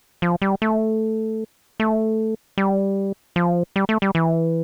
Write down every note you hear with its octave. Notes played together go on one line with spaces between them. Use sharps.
F3
G3
A3
A3
G3
F3
G3
A3
G3
E3